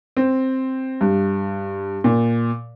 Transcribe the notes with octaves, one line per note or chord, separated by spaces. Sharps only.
C4
G2
A#2